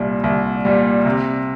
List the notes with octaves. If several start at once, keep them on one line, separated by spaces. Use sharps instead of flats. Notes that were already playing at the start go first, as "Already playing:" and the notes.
Already playing: C2 A#2 G3
C2
A#2 G3
C3